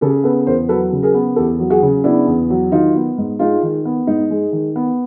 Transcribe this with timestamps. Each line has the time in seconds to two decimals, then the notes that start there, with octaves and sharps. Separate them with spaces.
0.01 C#3 G4 A4
0.24 B3 A4 B4
0.46 E2 A#4 C5
0.69 F#3 A4 B4
0.92 C#3
1.03 G#4 A#4
1.14 B3
1.36 E2 G4 A4
1.60 F#3
1.70 F#4 G#4
1.83 C#3
2.04 B3 D4 E4
2.27 E2
2.50 F#3
2.72 D#3 D#4 F4
2.95 B3
3.18 G#2
3.39 G#3 D#4 F4
3.63 D#3
3.85 B3
4.07 G#2 D#4
4.30 G#3
4.52 D#3
4.76 B3